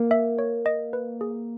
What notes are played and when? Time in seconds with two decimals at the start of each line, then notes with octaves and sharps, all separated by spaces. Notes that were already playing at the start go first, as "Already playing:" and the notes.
Already playing: A#3
0.11 E5
0.39 C#5
0.66 D#5
0.93 B4
1.21 G#4